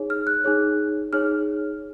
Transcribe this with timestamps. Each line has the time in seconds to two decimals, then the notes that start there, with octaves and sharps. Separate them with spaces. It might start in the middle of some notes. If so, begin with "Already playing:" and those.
Already playing: D#4 G#4 C#5
0.10 F6
0.27 F#6
0.44 D#4 G#4 C#5
1.13 D#4 G#4 C#5 F6